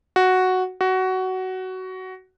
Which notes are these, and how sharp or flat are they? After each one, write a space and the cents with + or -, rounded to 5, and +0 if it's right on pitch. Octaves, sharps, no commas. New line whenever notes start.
F#4 +0
F#4 +15